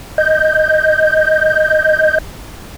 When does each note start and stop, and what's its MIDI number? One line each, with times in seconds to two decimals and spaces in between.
0.18 2.18 75
0.18 2.18 91